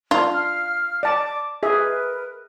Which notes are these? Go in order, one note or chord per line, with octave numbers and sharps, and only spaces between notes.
D4 F4
F5 F6
D5 A5 D6
G#4 A#4 B4 E5